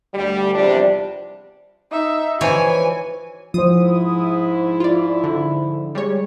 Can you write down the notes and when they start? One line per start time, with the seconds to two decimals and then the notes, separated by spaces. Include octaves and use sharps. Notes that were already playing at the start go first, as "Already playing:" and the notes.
0.14 D2 G3
0.54 E2 C3 F3 G3 D4
1.91 D#4 E5
2.41 E3 F3 F#4 C#5 G#5
3.54 G#2 F3 E4 C5 D#6
4.80 F4 D5
5.24 D3
5.95 G3 G#3 C#5